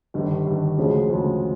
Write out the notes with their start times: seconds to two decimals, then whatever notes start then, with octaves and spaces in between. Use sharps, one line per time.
0.14 G1 G2 D#3
0.46 G1 G2 D#3
0.78 D2 C#3 F3 G#3
1.09 D2 C#3 F3 G#3